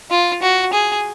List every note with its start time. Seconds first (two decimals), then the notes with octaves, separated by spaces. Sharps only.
0.11 F4
0.42 F#4
0.73 G#4